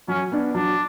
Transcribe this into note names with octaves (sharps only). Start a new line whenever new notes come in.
F#3 C#4
B3 D4
F#3 D4